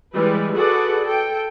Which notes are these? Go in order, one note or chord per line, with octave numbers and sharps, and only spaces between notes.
E3 G3 G#3 B4
F#4 G#4 A4 B4 D5 F#5
A4 G5